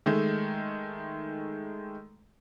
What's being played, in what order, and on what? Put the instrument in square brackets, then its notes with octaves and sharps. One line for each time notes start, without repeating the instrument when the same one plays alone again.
[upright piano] D#3 G#3 A3